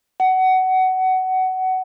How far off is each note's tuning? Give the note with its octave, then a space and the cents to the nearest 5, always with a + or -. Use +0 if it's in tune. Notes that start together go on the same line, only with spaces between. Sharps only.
F#5 +20